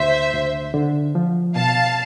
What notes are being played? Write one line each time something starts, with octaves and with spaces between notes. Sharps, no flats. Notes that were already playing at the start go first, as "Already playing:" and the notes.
Already playing: D2 C5 E5
D2
D3
F3
B2 F5 A5